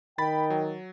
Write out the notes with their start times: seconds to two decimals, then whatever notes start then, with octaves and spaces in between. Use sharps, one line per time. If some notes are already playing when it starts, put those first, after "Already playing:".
0.18 D#3 G5 B5 A6
0.50 F#3